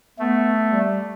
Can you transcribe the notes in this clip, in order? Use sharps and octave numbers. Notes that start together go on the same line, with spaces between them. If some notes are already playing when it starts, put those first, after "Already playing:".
A3 B3
G3